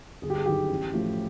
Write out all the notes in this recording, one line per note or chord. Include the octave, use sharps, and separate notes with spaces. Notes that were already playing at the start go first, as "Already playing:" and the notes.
G1 G#4
G4
G#4
F#2 D#3 G4
A1
A2 F3 A3